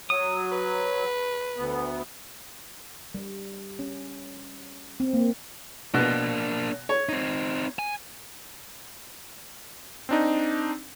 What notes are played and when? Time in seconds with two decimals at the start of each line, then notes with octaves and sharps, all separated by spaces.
0.10 F#3 D#6
0.52 B4
1.57 D2 B3
3.14 G3
3.79 C#4
5.00 C4
5.14 A#3
5.94 B2 A#3 D4
6.89 C#5
7.09 C4 D#4
7.79 G#5
10.09 C4 D4 D#4